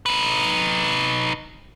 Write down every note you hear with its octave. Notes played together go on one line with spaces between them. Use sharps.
D#4 B4